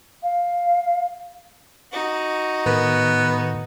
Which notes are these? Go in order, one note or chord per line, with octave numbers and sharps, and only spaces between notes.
F5
D#4 F#4
A2 D#3 B3